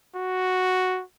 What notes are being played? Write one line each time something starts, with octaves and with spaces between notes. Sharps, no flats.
F#4